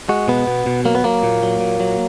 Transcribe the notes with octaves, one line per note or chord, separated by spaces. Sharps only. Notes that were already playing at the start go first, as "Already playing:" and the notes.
G#3 F#4
B2 B3
B2
B2
F#3 A#3
B3
F#3 A#3
A#2
F#3
A#2
F#3